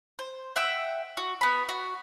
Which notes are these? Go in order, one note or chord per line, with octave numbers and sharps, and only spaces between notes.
C5
E5 F#5 G5 E6
F#4
B3 B5
F#4